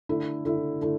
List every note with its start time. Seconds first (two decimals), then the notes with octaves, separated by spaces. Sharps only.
0.09 D3 A3 E4
0.45 D3 A3 E4
0.81 D3 A3 E4